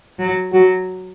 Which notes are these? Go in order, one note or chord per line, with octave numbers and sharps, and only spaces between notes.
F#3
F#3 F#4